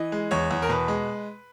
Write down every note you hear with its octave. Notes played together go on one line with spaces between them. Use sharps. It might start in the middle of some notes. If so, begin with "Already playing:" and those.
Already playing: E3 D#5
G#3
E2 C#5
E2
A#4
B2 B4
G#3